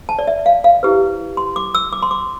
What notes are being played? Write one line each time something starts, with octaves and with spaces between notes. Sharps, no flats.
A5
D5
E5
F5
F5
E4 G4 B4
C6
D6
E6
D6
C6
D6